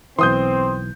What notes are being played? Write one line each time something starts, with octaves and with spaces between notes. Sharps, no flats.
B1 E3 C4 C6 D#6 G6